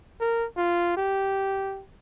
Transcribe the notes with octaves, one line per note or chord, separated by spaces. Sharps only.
A#4
F4
G4